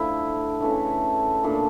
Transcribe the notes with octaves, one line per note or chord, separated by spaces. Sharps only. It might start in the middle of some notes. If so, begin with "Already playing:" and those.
Already playing: D3 F3 A3 E4
C#3 E3 A3 D4
A#2 A3 D4